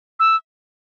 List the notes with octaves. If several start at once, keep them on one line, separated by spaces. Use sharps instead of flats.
E6